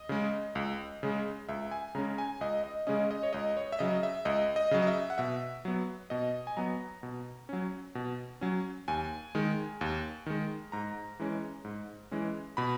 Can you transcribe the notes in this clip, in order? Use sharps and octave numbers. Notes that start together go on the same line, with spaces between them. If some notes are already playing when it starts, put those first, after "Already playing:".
Already playing: D#5
C#3 G#3
C#2
C#3 G#3
C#2 E5
G#5
C#3 G#3 C#4 A#5
G#5
C#2 D#5
D#5
C#3 G#3 C#4 D#5
D#5
C#5
C#2 D#5
C#5
E5
C#3 F#3 D#5
E5
C#2 D#5
D#5
C#3 F#3
D#5
E5
F#5
B2 E5
F#3 B3
B2 D#5
G#5
F#3 B3 A#5
B2
F#3 C#4
B2
F#3 C#4
D#2 G#5
D#3 G#3
D#2
D#3 G#3
G#2 A#5
E3 G#3 C#4
G#2
E3 G#3 C#4
B2 B5